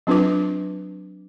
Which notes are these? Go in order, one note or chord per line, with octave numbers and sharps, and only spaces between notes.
F#3 C4 D4 F4 B4 D6